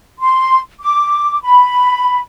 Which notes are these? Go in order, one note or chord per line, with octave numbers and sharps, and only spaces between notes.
C6
D6
B5